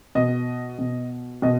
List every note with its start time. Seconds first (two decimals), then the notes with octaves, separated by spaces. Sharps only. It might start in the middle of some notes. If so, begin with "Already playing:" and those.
0.15 B2 D#5
0.79 B2
1.42 B2 D#5